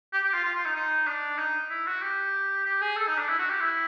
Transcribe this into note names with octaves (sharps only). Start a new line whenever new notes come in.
G4
G4
F4
F4
F4
D#4
D#4
D4
D#4
E4
F#4
G4
G4
G#4
A4
D#4
D4
E4
F#4
G4
E4